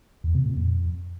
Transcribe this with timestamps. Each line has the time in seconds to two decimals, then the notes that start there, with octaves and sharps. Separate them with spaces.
0.24 E2
0.35 C3
0.46 A#2
0.56 F2